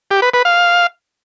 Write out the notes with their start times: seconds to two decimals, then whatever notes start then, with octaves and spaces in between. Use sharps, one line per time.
0.11 G4
0.22 B4
0.34 B4
0.45 F5